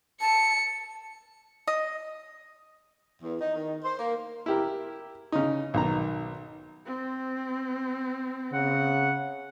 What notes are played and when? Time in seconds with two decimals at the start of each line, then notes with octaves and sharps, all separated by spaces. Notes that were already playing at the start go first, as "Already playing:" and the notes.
0.21 A5 C#7
1.67 D#5
3.22 E2
3.40 D#4
3.55 D#3
3.84 C5
3.99 A#3
4.46 E4 G4 A#4
5.32 C#3 D#4
5.74 B1 D#3 A#5
6.86 C4
8.53 C#3 F#5